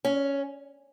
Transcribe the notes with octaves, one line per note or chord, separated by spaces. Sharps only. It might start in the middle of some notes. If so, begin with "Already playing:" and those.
C#4